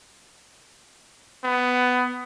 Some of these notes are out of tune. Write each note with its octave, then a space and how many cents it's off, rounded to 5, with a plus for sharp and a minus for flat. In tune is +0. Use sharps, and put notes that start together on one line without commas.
B3 +15